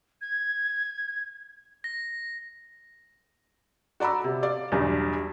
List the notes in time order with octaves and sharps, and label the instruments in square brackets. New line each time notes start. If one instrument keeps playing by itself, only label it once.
[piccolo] G#6
[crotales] A#6
[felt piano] F#4 D5 A#5 B5 E6
C3
D5 F5
B1 E2 G2 G3